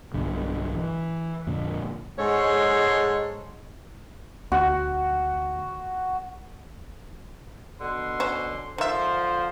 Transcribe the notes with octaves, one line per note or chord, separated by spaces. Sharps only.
B1 G2 D3
E3
F2 A#2 D3
G#2 G#3 A4 C#5 C6
D2 F#4
B2 D3 C6
C#4 C5
D3 D#3 F3 C5 E5